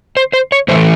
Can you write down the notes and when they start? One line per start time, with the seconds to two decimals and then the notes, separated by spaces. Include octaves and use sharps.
0.17 C5
0.33 C5
0.52 C#5
0.68 A2 E3 A3 C5